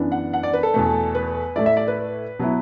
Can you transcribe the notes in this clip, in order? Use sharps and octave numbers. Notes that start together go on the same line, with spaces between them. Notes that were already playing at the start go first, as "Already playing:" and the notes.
Already playing: F#2 E3 B3 D4
F#5
F#5
D5
B4
A4
E2 B2 A3
B4
A2 A3 E4 D5
E5
D5
B4
B2 F#3 B3 E4